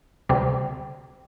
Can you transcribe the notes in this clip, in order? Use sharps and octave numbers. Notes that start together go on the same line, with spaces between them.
D2 C3 G3 C4